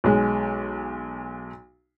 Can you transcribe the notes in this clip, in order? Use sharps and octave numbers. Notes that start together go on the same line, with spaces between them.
B1 G#3